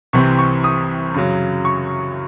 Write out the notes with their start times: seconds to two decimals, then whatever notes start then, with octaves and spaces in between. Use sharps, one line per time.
0.13 C2 C3 E3 C4 C#6
0.39 C#6
0.64 D#6
1.14 F#2 C#3 F#3
1.65 C#6